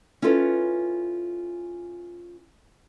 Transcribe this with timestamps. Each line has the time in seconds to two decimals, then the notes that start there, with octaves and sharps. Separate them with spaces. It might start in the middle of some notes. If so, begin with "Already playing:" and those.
0.22 C#4 E4 F4 A4 B4